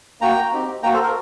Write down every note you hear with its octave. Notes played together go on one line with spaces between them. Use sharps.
A#3 F#4 G5 A#5
C4 D#4 G4
A#3 F#4 G5 A#5
A4 C5
A#4